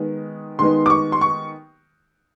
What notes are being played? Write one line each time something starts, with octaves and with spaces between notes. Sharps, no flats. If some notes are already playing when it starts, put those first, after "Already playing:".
Already playing: D#3 G#3 B3 D#4
D#3 G#3 B3 D#4 C6
D6
C#6
C6
C#6